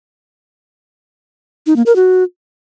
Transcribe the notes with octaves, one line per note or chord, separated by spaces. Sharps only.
D#4
A#3
A#4
F#4